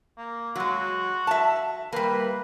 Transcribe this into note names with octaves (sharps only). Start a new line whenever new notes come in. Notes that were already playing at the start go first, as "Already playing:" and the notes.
A#3
F#3 G#3 F#4
E5 A5
G3 A#3 B4